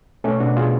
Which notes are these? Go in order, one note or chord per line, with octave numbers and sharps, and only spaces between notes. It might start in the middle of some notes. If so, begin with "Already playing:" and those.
B2 A3 C#4
B2 D4 F#4
B2 F4 G#4